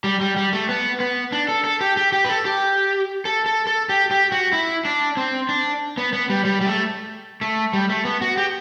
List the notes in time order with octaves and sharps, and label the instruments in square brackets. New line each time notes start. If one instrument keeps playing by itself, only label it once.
[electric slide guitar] G3
G3
G3
A3
B3
B3
D4
A4
A4
G4
G4
G4
B4
A4
G4
A4
A4
A4
G4
G4
F#4
E4
D4
C4
D4
B3
B3
G3
G3
G3
A3
A3
G3
A3
B3
F#4
G4